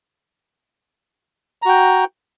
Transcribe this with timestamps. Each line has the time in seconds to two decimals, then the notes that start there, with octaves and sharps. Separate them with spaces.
1.62 A#5
1.65 F#4
1.69 G5